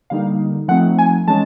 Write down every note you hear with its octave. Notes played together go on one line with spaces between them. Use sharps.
D3 G3 A#3 D#4 F5
F3 A3 C4 D#4 F#5
G#5
E3 G#3 C#4 A5